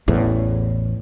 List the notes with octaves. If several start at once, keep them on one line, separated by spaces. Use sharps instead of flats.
A1 E2 A2